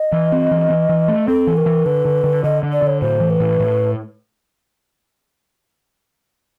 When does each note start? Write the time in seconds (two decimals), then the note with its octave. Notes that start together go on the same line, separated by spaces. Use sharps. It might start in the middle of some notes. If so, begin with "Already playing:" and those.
Already playing: D#5
0.12 E3
0.32 C4
0.51 E3
0.70 E3
0.89 E3
1.08 A3
1.28 C4 A4
1.47 E3
1.57 A#4
1.66 E3
1.86 D3 B4
2.05 D3
2.24 D3
2.44 D3 D#5
2.63 D3
2.72 D5
2.82 D3 C#5
3.01 A2 C5
3.20 E3
3.30 B4
3.40 A2
3.60 A2